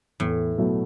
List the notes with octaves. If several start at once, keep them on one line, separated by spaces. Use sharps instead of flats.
E2 A2
B2 F#3 A3 E4